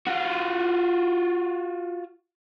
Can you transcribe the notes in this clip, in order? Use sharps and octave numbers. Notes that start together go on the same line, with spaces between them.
F4 F#4